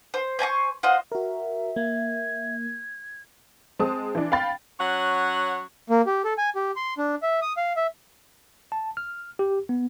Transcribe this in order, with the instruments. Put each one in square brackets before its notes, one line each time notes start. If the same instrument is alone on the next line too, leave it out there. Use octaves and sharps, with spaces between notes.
[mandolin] C5
C5 G#5 A#5 C#6
F4 C5 D#5 F#5
[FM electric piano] F#4 A#4 [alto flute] E5
[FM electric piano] A#3 [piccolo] G#6
[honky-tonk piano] G#3 C4 A5 D#6
E3 D4
F5 G5 B5 A6
[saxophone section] F#3 C#4 C#5 F#5
[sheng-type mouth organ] A#3
G4
A4
G#5
G4
C6
D4
E5
D#6
F5
E5
[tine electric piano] A5
F6
G4
B3